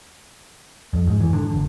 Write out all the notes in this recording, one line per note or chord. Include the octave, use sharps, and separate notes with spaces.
F2
G#2
E3
D3
F#1